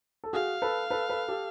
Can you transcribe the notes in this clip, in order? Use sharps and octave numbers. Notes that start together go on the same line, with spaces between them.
A4
F#4 G#4 F5
A4 B4
A4 B4
A4 B4
G4 A4